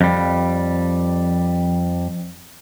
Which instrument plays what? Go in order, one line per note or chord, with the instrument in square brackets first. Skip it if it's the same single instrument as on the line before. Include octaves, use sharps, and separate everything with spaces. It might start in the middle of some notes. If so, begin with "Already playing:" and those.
[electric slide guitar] F2 G3